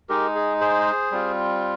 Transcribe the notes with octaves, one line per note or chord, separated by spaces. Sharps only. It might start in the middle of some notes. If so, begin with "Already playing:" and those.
G#3 D#4 G4 A#4
G#4
G#4 C5
G3 C4 F4